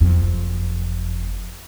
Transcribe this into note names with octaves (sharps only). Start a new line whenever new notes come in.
F#1 F2